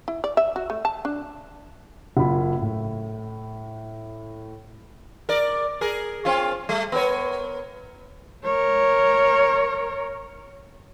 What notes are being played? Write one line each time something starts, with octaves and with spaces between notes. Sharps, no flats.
E4
D5
E5
F#4
A3
A5
D4
F#1 F#2 F4 B5
A2
A#4 D5
G#4 A#4
C4 C#4 F4
G3 A3
B3 A#4 C#5
A#4 C#5